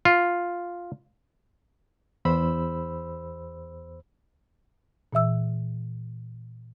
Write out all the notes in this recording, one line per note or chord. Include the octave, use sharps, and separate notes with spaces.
F4
E2 C5 B5 E6
A#2 E3 E5 E6